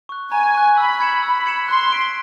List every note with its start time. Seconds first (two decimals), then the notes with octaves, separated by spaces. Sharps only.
0.09 C#6 F#6
0.32 G#5 A#5
0.55 C#6 F#6
0.78 B5 E6
1.01 G#6 C#7 E7
1.23 B5 E6
1.46 G#6 C#7 E7
1.68 C6 F#6
1.91 B6 D7 G7